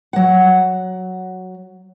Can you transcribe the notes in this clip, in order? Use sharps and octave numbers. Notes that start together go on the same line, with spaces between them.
F#3 F#5